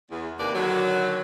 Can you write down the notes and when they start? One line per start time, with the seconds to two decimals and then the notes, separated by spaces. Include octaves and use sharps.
0.11 E2
0.39 D#2 C3 A#3 B4 D5
0.55 D3 D#3 F#3